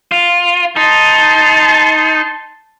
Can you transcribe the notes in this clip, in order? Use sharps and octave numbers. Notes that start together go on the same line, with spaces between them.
F4
D#4 A5 C6